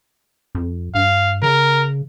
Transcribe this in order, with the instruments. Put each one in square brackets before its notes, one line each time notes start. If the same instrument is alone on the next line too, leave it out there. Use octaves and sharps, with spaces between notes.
[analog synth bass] F2
[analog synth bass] G2 [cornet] F5
[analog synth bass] C#3 [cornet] A#4